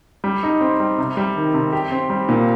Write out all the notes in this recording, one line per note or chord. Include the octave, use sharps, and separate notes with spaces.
G3
D#4
C4
G3
C3
G3
D#3
C3
G4
C4
G3
A#2